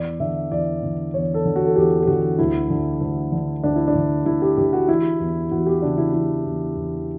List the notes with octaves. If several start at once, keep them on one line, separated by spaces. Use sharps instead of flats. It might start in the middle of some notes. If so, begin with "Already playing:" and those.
Already playing: E2 D5
D3 E5
E2 D5
D3
E2 C#5
A4
D3
F#4
A4
E2 G4
G4
D3 F#4
D2 E4
D3
D2
D3
D2 D4
E4
D4
D3
D2 E4
G4
D3 G4
F#4
E3 E4
E2
E2 F#4
G4
C#3 D4
E4
E3 E4
E2
E2